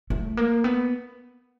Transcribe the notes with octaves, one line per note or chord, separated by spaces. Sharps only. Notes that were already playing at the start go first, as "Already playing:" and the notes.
A3
A#3
B3